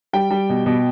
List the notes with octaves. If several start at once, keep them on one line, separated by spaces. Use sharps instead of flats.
G3 G5
G3
B2
B2